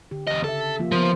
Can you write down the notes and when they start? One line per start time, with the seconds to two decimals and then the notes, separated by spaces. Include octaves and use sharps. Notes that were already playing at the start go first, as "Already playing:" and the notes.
0.11 D3 G4
0.27 E2 D#5
0.44 C#3 A4 E5
0.79 F3 A#3 F4
0.92 F3 B3 A#4